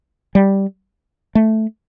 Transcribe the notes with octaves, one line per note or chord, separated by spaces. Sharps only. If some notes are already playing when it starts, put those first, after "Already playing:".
G3
A3